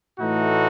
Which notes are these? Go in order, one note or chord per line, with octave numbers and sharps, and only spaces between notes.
A2 E3 A3 D#4 F#4